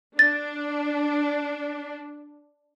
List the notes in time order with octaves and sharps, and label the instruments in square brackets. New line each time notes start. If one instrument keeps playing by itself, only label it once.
[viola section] D4 [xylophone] A6